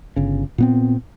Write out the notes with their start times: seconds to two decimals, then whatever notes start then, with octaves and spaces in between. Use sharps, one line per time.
0.16 G1 C#3
0.58 A#2 B3 C4